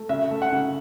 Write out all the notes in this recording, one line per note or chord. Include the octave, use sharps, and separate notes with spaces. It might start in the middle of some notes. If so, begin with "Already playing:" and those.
Already playing: A3
C#3 E5
A3
F#5
C#3